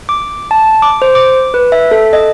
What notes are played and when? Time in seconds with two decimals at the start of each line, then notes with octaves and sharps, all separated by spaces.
0.09 D6
0.51 A5
0.82 D6
1.02 C5
1.15 D6
1.54 B4
1.72 E5
1.91 A4
2.13 D#5